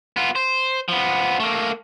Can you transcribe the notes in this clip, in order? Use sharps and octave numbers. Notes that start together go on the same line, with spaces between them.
B3 F4
C5
F3 B3
A3 A#3